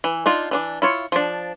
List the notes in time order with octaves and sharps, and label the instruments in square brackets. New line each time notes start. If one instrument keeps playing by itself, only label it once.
[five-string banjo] E3
D4 D#4 F4
E3 D4 D5
E4 F4 C#5
F3 D4